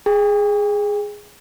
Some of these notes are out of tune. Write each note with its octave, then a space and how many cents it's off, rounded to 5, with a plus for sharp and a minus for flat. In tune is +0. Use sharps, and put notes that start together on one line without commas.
G#4 +0 G5 +35